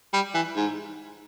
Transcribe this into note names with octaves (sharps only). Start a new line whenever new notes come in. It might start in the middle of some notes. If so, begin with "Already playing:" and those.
G3
E3
G#2